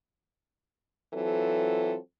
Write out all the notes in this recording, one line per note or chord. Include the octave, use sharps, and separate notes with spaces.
E3 F#3 C4 F4 A4